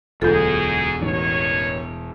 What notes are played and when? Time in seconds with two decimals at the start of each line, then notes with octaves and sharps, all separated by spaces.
0.22 E1 D2 G#2 F#3 F4 G#4 A4 G6
1.02 A1 G2 D#3 C#5